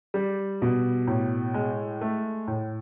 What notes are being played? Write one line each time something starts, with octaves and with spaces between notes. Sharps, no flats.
G3
B2
A2
G#3
A3
A2